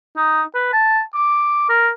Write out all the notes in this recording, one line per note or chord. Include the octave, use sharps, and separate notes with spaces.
D#4
B4
A5
D6
A#4